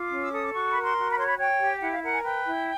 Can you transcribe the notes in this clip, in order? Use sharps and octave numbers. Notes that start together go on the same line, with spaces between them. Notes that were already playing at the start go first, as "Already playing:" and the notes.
Already playing: F4 D6
C#4
E6
A4 D#6
D6
F#4 C#6
A#4 B5
C6
F#4
B5
C#5 C6
B5
C#5 G5
G4
E4 F#5
F5
A#4 F#5
G#5
B4 G5
E4